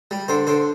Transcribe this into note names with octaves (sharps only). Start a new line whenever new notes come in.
G3
D3 C5
D3 C5